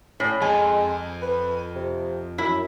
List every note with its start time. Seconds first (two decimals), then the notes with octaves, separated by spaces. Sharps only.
0.20 A2 C#4
0.42 F2 G#3 G#5
1.22 B4
1.76 C3
2.38 F#2 E4